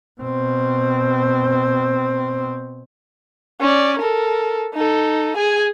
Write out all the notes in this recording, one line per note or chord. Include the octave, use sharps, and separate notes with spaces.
B2 C4
C#4 D5
A4 A#4
D#4 A4
G#4 G#5